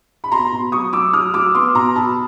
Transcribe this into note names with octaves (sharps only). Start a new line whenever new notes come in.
B5
B2 A#5 C6
B2
F#3 C#6 D#6
F#3 D6 E6
F#3 D#6 F6
F#3 D6 E6
B3 C6 D6
B2 A#5 C6
B2 A5 B5